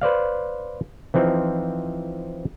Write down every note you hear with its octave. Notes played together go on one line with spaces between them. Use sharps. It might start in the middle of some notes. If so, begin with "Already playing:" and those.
B4 C5 D5 F5
E3 F3 C4 D#4